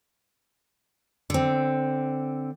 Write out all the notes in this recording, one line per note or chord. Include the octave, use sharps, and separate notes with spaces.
D3 C4